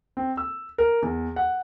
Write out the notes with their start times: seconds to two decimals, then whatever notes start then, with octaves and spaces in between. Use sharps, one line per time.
0.17 C4
0.37 E6
0.78 A#4
1.02 E2
1.36 F#5